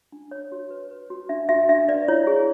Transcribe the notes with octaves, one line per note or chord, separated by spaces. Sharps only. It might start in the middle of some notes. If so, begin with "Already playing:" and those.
D4
C#5
F#4
B4
B4
F#4
D4 E5
F#4 E5
D4 E5
B4 D5
E4 C#5
G#4